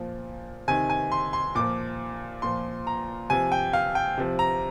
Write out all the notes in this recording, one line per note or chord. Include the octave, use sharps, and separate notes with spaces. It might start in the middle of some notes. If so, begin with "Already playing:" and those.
Already playing: A#2 F3
C3 D#3 G#5
G#5
C6
C6
A#2 F3 D6
A#2 F3 C6
A#5
C3 F3 G#5
G5
F5
G5
C3 F3
A#5